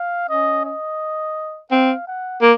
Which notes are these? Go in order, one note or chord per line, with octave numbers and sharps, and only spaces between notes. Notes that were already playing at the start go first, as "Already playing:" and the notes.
Already playing: F5
C#4 D#5
D#5
C4 F5
F#5
A#3